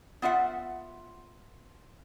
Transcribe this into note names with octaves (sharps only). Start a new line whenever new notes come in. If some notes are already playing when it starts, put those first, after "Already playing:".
B3 F4 E5 F#5